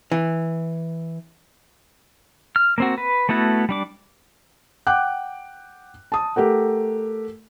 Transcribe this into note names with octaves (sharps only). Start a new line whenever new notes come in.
E3
F6
A#3 C4 F#4
B4
A3 B3 E4 F#4 A4
G3 D4 D6
F#5 G5 D6 F#6
A5 D#6
A3 G4 A#4 F#5